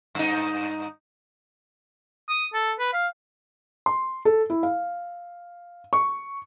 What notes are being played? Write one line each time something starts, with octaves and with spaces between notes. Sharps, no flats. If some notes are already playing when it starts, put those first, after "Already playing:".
G2 D#4
D#6
A4
B4
F5
C6
A4
E4
F5
C#6